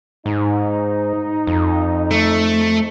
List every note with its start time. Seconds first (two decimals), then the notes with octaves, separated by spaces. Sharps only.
0.26 G#2 D#4
1.47 F2
2.11 A3